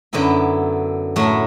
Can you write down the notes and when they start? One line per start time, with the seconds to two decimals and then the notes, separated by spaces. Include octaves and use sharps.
0.13 F#2 D3 F#3 B3 E4
1.16 A2 F#3 A3